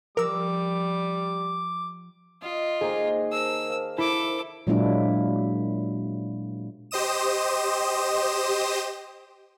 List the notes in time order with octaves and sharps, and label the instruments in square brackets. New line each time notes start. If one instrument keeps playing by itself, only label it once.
[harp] F3 [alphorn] G3 [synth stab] A#4 E6 [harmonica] D6
[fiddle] F4 [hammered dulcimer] D#5
[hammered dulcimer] D#3 A#3 A#5 [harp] G#4 [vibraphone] C5
[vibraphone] A#4 C5 A5 [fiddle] E6
[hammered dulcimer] F5
[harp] E4 [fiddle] A4 D6
[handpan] A#2 F#3 G#3 A#3 D4 E4
[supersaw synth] G4 C5 D#5 D#6 E7